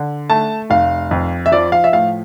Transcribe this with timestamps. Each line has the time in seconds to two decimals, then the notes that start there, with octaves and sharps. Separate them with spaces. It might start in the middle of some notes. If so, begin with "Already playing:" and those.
Already playing: D3
0.30 A3 A5
0.70 F1 F5
1.11 F2
1.46 E5
1.52 F3 D5
1.72 F5
1.84 E5
1.93 A2 F5